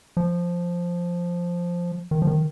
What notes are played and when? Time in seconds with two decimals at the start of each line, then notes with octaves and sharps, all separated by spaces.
0.17 F3
2.11 D#3
2.22 F3
2.27 D#3